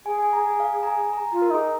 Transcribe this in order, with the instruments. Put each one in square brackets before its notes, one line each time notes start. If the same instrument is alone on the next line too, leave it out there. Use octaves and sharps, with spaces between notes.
[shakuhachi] G#4 [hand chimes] G#5
[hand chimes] G#5
A#5
G#5
F5
A#5
G#5
A#5
[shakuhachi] F4 [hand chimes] A#5
[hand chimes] A#4
[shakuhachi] D#4 [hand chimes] G#4